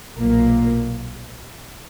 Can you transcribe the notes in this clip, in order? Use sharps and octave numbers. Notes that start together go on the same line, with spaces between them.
B1 A#2 A#3